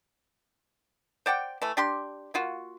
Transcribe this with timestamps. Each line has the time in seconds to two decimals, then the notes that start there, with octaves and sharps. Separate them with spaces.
1.26 C5 D5 F#5 G5
1.62 E3 A3
1.77 D4 G4 C6
2.34 A#3 F4 F#4